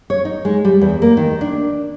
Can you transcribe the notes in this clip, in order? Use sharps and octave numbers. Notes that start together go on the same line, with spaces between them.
C#5
D#4
G#3
G3
E2
A#3
D#3
D4